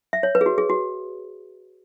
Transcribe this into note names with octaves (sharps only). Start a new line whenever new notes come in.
E5
C#5
B4
G#4
F#4
G#4
F#4